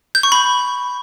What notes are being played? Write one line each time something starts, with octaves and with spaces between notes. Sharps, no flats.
G6
C#6
B5